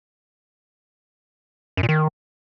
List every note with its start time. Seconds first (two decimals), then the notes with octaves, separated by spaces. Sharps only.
1.77 F#2
1.83 A#2
1.89 D#3